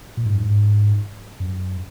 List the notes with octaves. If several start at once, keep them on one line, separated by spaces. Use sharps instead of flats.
A#2
G#2
F#2
G#2
F#2